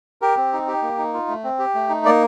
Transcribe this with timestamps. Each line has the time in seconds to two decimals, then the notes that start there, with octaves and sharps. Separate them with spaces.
0.22 G4 A#4
0.37 C4
0.53 D#4
0.68 G4
0.82 A#3
0.98 D#4
1.13 F4
1.28 A3
1.44 C4
1.59 G4
1.75 A3
1.89 D#4
2.05 A#3 D5